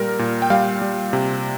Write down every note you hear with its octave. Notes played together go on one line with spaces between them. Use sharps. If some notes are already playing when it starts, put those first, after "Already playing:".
Already playing: A#2 G3 A#4
A#2
G5
G3 F5
G3
C3